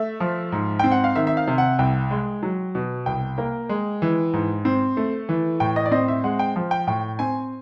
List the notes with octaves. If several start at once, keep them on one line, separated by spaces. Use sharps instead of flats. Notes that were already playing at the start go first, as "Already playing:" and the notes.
Already playing: A3 E5
F3
G#2
C4 G5
F#5
F5
D#3 E5
E5
F5
C3
F#5
C2 G5
G#3
F#3
B2
C2 G5
A#3
G#3
E3
G#2
C4
A3
E3
A2 G5
D#5
D5
C4 D#5
E5
G#3 F#5
G5
F3
G5
A2 G5
C4 G#5